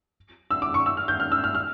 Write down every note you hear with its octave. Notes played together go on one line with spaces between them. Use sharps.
E6
D6
C#6
E6
F6
G6
F6
E6
F6
F6